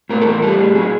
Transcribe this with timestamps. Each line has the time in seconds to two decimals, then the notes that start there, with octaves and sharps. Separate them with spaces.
0.09 A2 A#4
0.21 A4
0.26 E3 A#4
0.42 G3 A4
0.58 A2 G#4
0.75 F#3 G#4